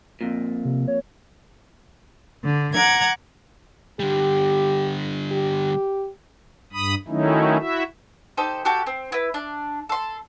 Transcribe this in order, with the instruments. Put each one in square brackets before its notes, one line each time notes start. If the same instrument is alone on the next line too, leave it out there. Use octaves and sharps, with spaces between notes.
[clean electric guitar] F2 A#2
[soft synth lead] C3
C#5
[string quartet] D3
F#5 A#5 D6 G#6
[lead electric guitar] D3 G3 [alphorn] G4
[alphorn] G4
[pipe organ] G2 B5 D#6
D#3 F#3 A3 C#4 D#4 E4
E4 F#4 E5
[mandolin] D#4 G4 A4 C5
F#4 G4 A4 G5
C4
E4 B4
D4
A4 C6